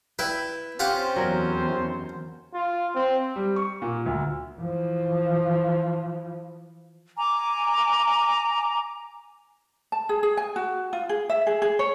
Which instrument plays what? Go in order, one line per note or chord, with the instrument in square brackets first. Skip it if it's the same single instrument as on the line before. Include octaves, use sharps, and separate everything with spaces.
[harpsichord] E4 B4 [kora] G5
[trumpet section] C4 C#4 C5 [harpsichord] F4 G4 F#5
[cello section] E2 [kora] F#3 A#4
[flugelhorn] F4
C4
[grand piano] G3
C#6
A#2
D2
[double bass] E3 F3
[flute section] G#5 A#5 D6
[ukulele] A5
G#4
G#4
G#5
F#4
F4
G#4
E5
G#4
G#4
C#5